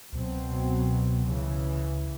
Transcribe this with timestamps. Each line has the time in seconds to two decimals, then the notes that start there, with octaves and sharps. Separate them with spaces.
0.13 C#2 B2 F#3 C4
1.26 C#3 E3